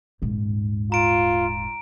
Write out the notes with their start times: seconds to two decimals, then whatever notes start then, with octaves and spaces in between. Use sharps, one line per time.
0.22 D#1 G#2
0.92 F4 A#5 D7